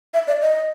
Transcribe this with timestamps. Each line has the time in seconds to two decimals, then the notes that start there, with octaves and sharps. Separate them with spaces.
0.14 E5
0.27 D5
0.42 D#5